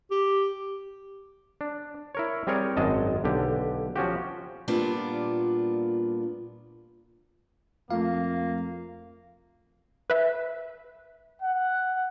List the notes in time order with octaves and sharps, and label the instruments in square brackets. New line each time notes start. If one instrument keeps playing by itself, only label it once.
[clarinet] G4
[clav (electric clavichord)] D4
E4 A#4 C#5
G3 C4 G#4 A#4 C#5 D5
G#1 F#2 G#3 D#5 A5
B1 D3 G4
F3 C#4 F#4 G4
[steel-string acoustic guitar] A#2 G3 A#3 B3 D4 F4
[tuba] F2 [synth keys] A3 F4 [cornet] A#3 [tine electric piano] F5
[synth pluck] B4 E5
[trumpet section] F#5